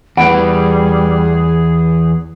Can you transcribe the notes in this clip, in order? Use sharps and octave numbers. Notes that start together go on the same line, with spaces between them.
E2 E3 G3 G#4 F#5 B5 D7